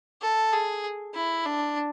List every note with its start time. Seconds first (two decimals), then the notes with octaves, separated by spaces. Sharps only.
0.22 A4
0.53 G#4
1.15 E4
1.45 D4